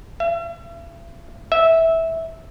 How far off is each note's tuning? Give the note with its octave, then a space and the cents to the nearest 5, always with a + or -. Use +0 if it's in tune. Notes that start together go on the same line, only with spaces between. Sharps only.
E5 +40
E5 -15